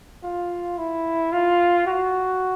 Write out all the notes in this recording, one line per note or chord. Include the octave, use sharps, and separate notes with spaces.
F4
E4
F4
F#4